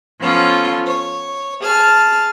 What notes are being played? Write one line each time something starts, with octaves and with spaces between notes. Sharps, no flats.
F3 B3 C#4 F4 A4
C#5
G#4 A5 F6